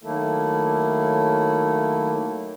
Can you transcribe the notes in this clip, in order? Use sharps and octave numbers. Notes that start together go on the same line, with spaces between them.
D#3 F#3 A3 A#3 E4 A4